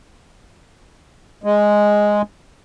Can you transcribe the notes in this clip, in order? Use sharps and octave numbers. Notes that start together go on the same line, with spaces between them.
G#3